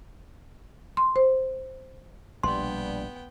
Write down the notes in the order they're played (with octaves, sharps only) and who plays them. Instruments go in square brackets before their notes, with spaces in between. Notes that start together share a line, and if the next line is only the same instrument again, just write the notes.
[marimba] C6
C5
[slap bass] A#1 B2 [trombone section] G3 D4 [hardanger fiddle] B3 G5 [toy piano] C6